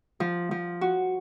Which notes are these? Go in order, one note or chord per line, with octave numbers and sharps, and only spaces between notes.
F3
F3
F#4